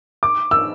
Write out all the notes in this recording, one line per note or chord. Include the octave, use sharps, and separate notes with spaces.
D6
E6